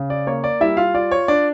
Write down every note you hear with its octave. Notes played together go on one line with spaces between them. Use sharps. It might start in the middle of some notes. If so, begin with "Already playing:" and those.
Already playing: C#3
D5
A#3 C#5
D5
G3 E4 E5
F4 F5
F4 D5
C#5
D4 D5